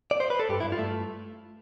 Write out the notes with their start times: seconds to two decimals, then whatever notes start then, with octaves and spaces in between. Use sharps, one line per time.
0.11 D5
0.20 C5
0.30 B4
0.40 A4
0.49 G2 G4
0.60 E4
0.64 G2
0.72 F4
0.79 A3